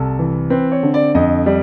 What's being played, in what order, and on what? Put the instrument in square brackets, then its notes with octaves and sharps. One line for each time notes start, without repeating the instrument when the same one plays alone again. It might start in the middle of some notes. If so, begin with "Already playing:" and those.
Already playing: [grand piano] C2 A4
E3
C4 B4
C#5
D3
D5
F2 D#5
G3